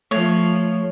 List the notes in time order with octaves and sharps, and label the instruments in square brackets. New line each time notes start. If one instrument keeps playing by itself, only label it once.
[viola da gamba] F3 [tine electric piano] A3 [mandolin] C#5